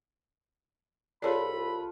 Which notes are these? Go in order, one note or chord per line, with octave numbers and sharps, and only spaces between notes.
C2 F4 G#4 A4 B4 C#5 D5 B5